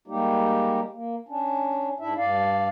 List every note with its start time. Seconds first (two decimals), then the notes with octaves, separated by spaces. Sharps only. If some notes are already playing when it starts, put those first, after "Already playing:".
0.08 G3 G#3 A#3 D#4 G4
0.93 A#3
1.29 C#4 D4
2.00 G#2 D4 E4 E5
2.17 G2 D5 F5